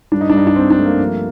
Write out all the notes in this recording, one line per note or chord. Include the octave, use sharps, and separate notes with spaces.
G2 D4
D#4
D4
G2 D#4
D4
G2 C4
D4
A3
A#3
F3